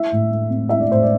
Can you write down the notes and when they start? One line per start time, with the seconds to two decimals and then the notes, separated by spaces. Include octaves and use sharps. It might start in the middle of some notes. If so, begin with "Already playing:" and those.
Already playing: E4 E5
0.12 A2
0.31 A3
0.50 C4
0.69 E4 E5
0.80 D5
0.89 A2 C5
1.03 D5